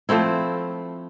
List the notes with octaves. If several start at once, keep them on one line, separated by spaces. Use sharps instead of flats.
F3 A3 C4 E4